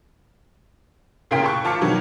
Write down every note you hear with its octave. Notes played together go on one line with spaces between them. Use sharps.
A1 A#2 C#3 A#4 G5 B6
A5 C#6 F#6
G#1 F4 A5 D6 C#7
B2 D#3 F#3